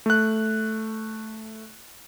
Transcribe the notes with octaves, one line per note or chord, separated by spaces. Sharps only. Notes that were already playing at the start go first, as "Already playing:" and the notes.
A3 F#6